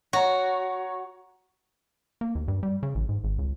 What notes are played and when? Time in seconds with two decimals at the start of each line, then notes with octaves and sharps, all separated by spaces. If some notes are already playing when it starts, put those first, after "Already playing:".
0.13 F#4 C#5 A#5
2.21 A#3
2.35 D#2
2.48 G2
2.63 G3
2.83 C#3
2.95 A1
3.09 G#2
3.24 G#1
3.39 C#2